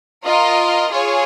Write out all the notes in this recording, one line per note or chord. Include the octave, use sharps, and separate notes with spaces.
F4 A#4 D#5
F4 G#4 C#5